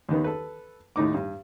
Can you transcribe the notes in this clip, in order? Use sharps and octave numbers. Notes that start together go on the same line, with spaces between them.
D#2 D#3 B3
A4 B4
D#2 A2 D#4 D6
G2